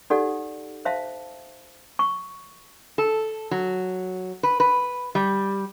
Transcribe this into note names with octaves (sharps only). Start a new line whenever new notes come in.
D#4 G4 A4 D5 F#5
C5 E5 F5 A5
C#6
A4
F#3
B4
B4
G3